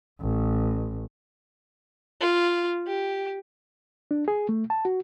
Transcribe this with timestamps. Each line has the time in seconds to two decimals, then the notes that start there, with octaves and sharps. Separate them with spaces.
0.21 A1
2.20 F4
2.86 G4
4.11 D4
4.28 G#4
4.49 A3
4.70 A5
4.85 F#4